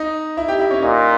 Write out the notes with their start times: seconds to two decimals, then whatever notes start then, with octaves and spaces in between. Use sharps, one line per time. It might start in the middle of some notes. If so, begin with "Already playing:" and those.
Already playing: D#4 D#5
0.37 E4 E5
0.48 G4 G5
0.59 E4 E5
0.71 C#4 C#5
0.81 A#2 D#4 D#5